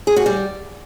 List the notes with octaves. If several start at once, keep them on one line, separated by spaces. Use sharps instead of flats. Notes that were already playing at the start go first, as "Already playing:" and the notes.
G#4
F#4
G3